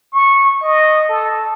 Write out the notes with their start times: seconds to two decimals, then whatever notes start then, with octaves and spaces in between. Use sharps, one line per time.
0.12 C#6
0.62 D#5
1.09 A4